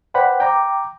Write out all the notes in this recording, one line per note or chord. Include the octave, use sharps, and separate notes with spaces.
B4 C5 D5 F#5 G5 B5
G5 A#5 D6